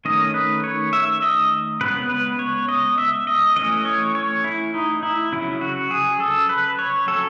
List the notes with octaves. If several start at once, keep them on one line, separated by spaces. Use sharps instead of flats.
D#3 A3 C#4 D#5
B4
C#5
E5
D#5
C#3 G#3 B3 B4
B4
C#5
D#5
E5
D#5
E3 A3 C#4 D#5
C#5
C#5
E4
D#4
E4
C#3 F#3 C#4 E4
F#4
G#4
A4
B4
C#5
F#3 C#4 A4